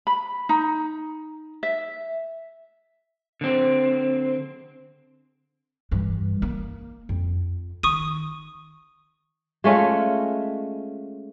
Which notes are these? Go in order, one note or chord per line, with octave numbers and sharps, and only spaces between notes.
B5
D#4
E5
D3 C4
G2 E3
A#3
F2
D#3 C#6 D#6 D#7
G#3 A3 C#4 F4